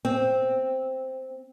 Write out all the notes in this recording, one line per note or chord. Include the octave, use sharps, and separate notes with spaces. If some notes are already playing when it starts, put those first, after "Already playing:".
C4